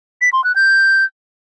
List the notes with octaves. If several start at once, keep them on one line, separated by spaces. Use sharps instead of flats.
B6
C6
F#6
G6